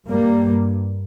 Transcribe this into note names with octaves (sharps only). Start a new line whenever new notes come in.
G2 G3 A#3